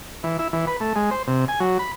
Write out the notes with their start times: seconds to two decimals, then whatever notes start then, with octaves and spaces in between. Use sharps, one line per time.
0.23 E3
0.39 E4
0.53 E3
0.67 B4
0.80 A3
0.96 G#3
1.11 C5
1.27 C3
1.48 G#5
1.60 F#3
1.79 B5